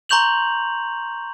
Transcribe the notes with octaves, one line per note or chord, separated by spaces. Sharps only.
A#5 C6 C#6 G6 F7 F#7